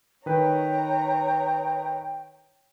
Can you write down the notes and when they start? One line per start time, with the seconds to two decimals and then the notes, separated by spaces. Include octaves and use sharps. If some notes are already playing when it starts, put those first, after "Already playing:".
0.26 D#3 B4 C#5 G5 A#5